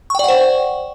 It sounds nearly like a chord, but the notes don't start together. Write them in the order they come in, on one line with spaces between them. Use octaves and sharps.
C#6 G5 D5 F#5 C5